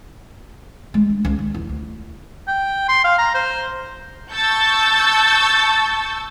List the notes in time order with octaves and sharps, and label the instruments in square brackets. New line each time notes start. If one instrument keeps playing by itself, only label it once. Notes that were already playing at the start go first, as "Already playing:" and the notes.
[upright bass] G#3
D4
C#2
D#3
E2
D2
[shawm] G5
C6
F5
A#5
C5
[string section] A5 C#6 E6 G6 A6